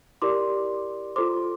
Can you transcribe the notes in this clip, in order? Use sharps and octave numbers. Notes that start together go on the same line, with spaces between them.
E4 G4 A#4 D5 C6 D6
F4 A4 C5 C6 D6